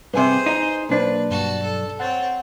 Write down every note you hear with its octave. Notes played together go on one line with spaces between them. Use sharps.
G2 C3 G#4 B4 C5 G#5 C6
D#4
B1 A#3 D4 B4 C5
G2 F#4 A5
A4
C4 C#5 F#5 A6